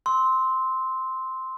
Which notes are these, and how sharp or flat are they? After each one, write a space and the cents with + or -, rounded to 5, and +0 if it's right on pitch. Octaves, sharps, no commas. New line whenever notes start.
C6 -5 E6 -30